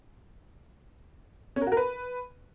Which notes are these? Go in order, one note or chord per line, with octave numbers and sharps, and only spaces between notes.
C#4
A#4
F#4
A#4
B4